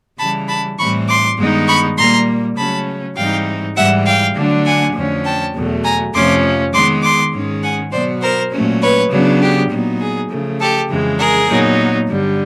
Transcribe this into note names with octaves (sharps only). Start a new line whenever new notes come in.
C#3 E3 G3 A5 B5
A5 B5
A2 E3 G3 C4 B5 C#6
C6 D6
G2 D#3 G#3 B3 D#4
B5 C#6
A#2 G3 A#3 A#5 C6
C#3 F#3 A3 C#4 A5 B5
G#2 E3 G3 C4 D#4 F5 G5
G#2 E3 G3 E5 F#5
F5 G5
D3 F#3 A3 D4
F#5 G#5
F2 D3 F3 A3 C#4
G5 A5
E2 B2 F#3 A3
G#5 A#5
F2 C3 F3 A3 C#4 C6 D6
D#3 G#3 B3 C6 D6
C6 D6
G#2 D#3 G#3 C#4
F#5 G#5
B2 F#3 B3 C5 D5
A#4 C5
A#2 F#3 A3 C#4
B4 C#5
C#3 F#3 B3 D4
G4
A#2 F#3 B3 D#4
G#4
C#3 F3 A3
G4 A4
F2 C#3 E3 G#3
G#4 A#4
A#2 F#3 B3 D#4
G2 D3 G3